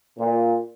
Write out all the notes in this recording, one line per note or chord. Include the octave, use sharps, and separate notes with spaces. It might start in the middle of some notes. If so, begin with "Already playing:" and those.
A#2